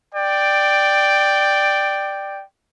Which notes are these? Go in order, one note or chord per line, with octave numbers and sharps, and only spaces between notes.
D5 G5